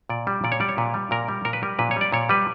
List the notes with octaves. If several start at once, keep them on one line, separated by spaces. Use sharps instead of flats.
A#2 D5
G3
A#2 D5
C#5
G3 D5
C#5
A#2 B4
G3
A#2 A#4
G3
A#2 A#4
B4
G3 A#4
A#2 B4
C#5
G3 D5
A#2 C#5
G3 B4